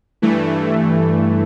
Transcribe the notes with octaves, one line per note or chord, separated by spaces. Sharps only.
G2 E3 A3